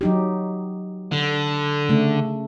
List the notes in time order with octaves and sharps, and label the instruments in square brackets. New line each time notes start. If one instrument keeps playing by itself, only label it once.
[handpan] F#3 D#4 G4
[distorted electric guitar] D3
[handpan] C#3 A3